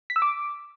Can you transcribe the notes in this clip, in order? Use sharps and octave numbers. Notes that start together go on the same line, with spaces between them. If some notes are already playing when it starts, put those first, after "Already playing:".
B6
E6
D6